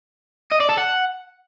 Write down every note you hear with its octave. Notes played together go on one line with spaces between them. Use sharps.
D#5
D5
A4
F#5